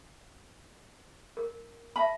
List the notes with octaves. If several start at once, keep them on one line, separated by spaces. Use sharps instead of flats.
A#4
E5 A5 B5